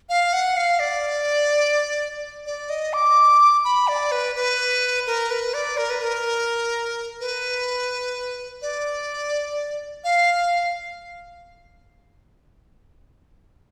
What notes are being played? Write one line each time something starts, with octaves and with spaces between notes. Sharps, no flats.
F5
F#5
F5
D5
D5
D#5
D6
B5
D5
B4
B4
A#4
B4
D5
A#4
B4
A#4
B4
D5
F5